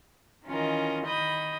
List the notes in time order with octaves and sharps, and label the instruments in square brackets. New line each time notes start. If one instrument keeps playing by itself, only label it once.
[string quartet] D#3 E3 C#4 F4 A#4 D#5
D#3 D#5 B5 D#6 G6